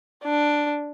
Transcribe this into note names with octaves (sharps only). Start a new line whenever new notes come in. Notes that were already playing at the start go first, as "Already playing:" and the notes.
D4